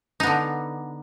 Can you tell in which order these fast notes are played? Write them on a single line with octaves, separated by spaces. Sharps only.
D#4 B3 D3